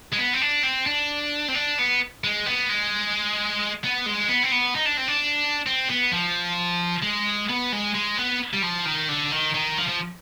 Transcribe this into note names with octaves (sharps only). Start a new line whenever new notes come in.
G#3
B3
C4
D4
C4
D4
C4
D4
B3
G#3
B3
G#3
B3
G#3
B3
C4
B3
D#4
D4
C4
D4
C4
B3
F3
G#3
B3
G#3
G#3
B3
G3
F3
D#3
D3
D#3
D#3
F3
F3